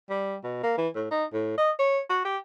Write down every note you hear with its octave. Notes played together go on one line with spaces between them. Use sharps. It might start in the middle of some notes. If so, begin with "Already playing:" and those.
G3
B2
A#3
E3
A2
D#4
A2
D#5
C#5
F#4
G4